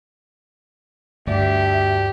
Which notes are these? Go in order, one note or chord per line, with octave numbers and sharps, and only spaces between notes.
D2 G2 G4 D5 E5